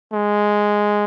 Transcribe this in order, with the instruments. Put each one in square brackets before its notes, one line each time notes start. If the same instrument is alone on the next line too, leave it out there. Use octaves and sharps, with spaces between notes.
[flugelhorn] G#3